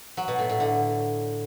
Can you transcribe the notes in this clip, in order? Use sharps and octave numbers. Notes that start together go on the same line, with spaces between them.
F#3
B2
A2
A2
D3